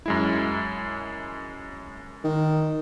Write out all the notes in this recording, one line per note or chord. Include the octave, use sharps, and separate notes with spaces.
F#2 G#3 E4
D#3